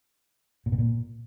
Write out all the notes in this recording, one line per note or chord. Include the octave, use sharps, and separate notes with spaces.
A#2
B2
A#2